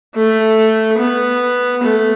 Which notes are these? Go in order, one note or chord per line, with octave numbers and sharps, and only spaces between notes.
A3
B3
A3